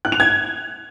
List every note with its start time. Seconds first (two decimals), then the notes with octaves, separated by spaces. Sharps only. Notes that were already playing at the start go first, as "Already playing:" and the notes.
0.05 F#6
0.12 F7
0.20 G#6